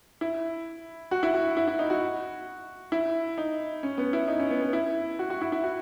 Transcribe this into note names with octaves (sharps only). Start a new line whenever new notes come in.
E4
F#4
E4
F#4
E4
E4
D#4
F#4
E4
D#4
C#4
B3
E4
D#4
C#4
B3
B3
E4
F#4
F#4
E4
E4
F#4